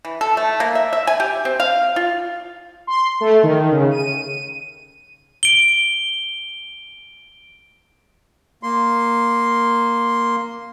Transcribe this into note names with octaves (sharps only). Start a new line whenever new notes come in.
E3
A4
A3
A#3
E5
E5
G#5
G4
C4
F5
F4
C6
A3
D#3
C#3
D#7
D7 G7
A#3 C6